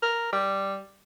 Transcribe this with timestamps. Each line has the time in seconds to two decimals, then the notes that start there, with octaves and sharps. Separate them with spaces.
0.02 A#4
0.33 G3